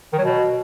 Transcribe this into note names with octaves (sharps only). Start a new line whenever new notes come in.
D#3
F#3
B2